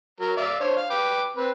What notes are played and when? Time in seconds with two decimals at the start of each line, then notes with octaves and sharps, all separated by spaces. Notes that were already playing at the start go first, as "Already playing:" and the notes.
0.21 F#3 A#4
0.37 D5 E5 F5
0.60 D4 C5 C#5
0.77 F5
0.90 B4 G5 D6
1.37 C4 B4